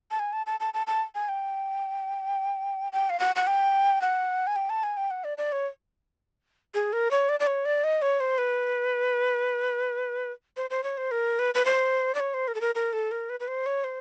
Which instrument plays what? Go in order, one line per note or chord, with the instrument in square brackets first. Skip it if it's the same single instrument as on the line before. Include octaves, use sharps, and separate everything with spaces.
[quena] A5
G#5
A5
A5
A5
A5
A5
G#5
G5
G5
F5
F#5
F#5
G5
F#5
G#5
G5
A5
G#5
G5
F#5
D5
D5
C#5
G#4
A#4
C#5
D5
D5
C#5
D5
D#5
C#5
C5
B4
C5
C5
C#5
C5
A#4
B4
B4
C5
D5
C#5
C5
A#4
A4
A#4
A#4
A4
A#4
B4
B4
C5
C#5
C5